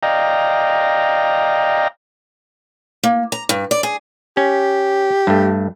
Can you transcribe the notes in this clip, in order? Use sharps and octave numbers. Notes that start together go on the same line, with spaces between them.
D5 D#5 F5 G5 A#5
A#3
A#5
G2
D5
G#4
C#4 G4
G2 A3